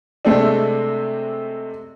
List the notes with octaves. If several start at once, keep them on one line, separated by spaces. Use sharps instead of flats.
C3 G#3 A3 C4 D4